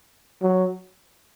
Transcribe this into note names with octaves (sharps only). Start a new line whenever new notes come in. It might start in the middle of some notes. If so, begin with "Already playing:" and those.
F#3